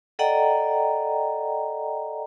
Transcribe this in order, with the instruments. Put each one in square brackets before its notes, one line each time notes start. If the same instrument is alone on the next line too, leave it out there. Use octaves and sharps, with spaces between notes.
[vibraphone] A4 D5 D#5 F#5 G5 A#5